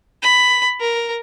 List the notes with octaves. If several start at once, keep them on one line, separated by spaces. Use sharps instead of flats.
B5
A#4